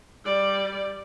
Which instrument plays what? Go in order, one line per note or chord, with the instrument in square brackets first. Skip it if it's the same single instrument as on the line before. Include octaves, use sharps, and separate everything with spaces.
[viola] G3 D5